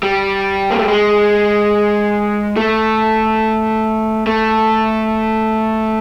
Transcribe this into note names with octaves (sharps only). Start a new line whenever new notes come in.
G3
A#3
A3
G#3
A3
A3